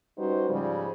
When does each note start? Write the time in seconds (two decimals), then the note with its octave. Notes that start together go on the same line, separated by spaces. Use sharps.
0.18 G3 C#4 D#4 F#4 B4 C5
0.48 G#2 C#3 F3 G3